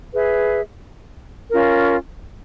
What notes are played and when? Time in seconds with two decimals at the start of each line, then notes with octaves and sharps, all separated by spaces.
0.13 G#4 B4 E5
1.50 C#4 F4 A#4